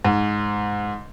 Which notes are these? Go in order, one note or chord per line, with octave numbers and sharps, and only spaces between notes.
G#2